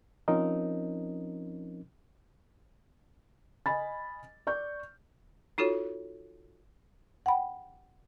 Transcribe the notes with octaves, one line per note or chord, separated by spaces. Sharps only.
F3 C4 C#4 D#4 A#4 D#5
D#5 G#5 B5 A6
D5 C#6 G6
D#4 F4 F#4 A4 C#5
F#5 G5 B5